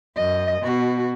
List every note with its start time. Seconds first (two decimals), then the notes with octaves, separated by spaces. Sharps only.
0.17 F#2 D#5
0.62 B2 F#4